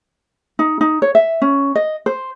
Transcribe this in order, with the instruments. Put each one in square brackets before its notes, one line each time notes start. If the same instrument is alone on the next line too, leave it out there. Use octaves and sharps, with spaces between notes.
[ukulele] D#4
D#4
C#5
E5
C#4
D#5
C5